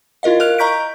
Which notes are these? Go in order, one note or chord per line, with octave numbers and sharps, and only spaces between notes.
E4 F4 A#4 D#5 F5
A#4 F5 F6 F#6 F7
D#5 A#5 C#6 G6 B6 D7